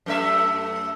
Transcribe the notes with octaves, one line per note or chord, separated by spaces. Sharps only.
F#2 A3 E5